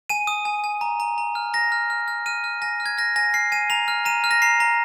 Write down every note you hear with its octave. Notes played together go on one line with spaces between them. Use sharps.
G#5 D#7
D#6
G#5
G#5
A#5
A#5
A#5
F6
A#5 A#6
F6
F6
F6
F6 D#7
F6
G#5 A#6
F6
G#6
F6 A#6
G#5 A#6
F6 C7
G#5 D#7
A#5 F7
F6
A#5 D#7
F6
A#6
A#5 C7
A#5